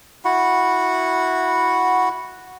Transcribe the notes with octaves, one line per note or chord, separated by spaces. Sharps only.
E4 F#4 F#5